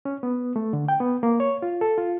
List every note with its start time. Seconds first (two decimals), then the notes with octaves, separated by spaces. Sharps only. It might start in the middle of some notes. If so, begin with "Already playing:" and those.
0.05 C#4
0.23 B3
0.56 A3
0.73 D3
0.88 G5
1.00 B3
1.23 A#3
1.40 C#5
1.62 F4
1.81 A4
1.98 F4